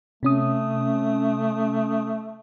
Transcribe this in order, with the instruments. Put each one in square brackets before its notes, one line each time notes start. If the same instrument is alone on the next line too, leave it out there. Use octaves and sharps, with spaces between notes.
[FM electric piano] C3 C#4 D#6 [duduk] A3